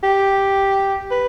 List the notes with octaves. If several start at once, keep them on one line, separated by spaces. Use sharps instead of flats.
G4
B4